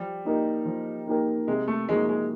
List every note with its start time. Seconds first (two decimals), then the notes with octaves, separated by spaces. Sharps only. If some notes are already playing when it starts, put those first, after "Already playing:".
Already playing: F3 G3
0.25 A#3 D#4 G4 A#4
0.65 F3
1.07 A#3 D#4 G4 A#4
1.47 C3 G#3
1.68 A3
1.89 F3 G#3 A#3 D#4 F#4
2.09 G#3